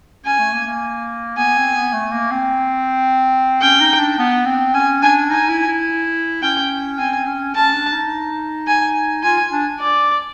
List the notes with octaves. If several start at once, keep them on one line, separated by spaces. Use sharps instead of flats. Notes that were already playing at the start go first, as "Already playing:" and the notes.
C#4 G#5
A3
A#3
A#3
B3 G#5
C4
B3
A3
A#3
C4
C#4 G5
D#4
D4
B3
C4
C#4 G#5
D4 G#5
D#4 G#5
E4
E4
C#4 G5
C4 G#5
C#4
C#4 A5
D4
D#4
G#5
F4 G#5
D4
D5